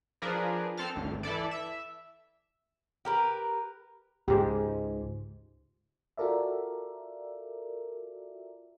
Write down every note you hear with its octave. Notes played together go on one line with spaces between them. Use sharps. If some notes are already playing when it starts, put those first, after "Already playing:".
F3 D4 G#4 A#4 B4
C4 A4 A5 F6
G#1 D2
E3 E4 A4 D5
E5
G4 A#4 B4
C#2 G#2 G#3 G4
F4 F#4 A4 A#4 D5 E5